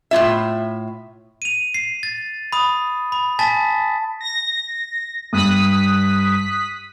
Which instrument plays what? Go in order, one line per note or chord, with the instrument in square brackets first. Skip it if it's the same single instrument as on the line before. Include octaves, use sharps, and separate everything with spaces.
[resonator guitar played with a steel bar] A2 A#3 F4 E5
[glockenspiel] D#7 F7
C7
A6
B5 D#6
B5
G#5 A5 A6 B6
[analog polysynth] A#6
[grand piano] G2 [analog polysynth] D#6 F#6 B6